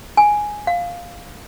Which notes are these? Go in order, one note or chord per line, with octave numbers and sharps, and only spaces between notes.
G#5
F5